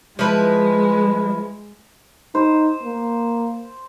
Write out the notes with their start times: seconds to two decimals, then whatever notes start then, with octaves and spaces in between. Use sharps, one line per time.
0.19 F3 G#3 E4 B4
2.35 D#4 C5
2.83 A#3